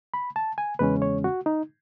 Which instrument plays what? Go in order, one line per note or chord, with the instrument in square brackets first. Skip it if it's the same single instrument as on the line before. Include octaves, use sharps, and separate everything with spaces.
[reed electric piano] B5
A5
G#5
E2 C#3 G#3 C#4 B4
C#5
F#4
D#4